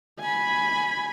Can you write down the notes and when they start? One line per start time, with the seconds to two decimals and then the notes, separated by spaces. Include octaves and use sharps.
0.20 G#5 B5